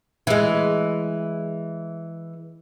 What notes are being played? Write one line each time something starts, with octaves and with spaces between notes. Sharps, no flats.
E3 G#3